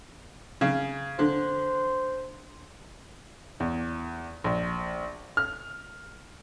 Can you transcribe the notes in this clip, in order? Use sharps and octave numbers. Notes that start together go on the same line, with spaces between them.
C#3
D3 C5
E2
A#1
F6